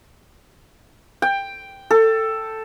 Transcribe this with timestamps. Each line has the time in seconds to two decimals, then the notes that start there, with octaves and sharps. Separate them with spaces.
1.22 G5
1.91 A4